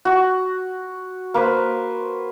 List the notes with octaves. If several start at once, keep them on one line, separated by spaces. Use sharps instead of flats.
F#4
A#3 B4 C5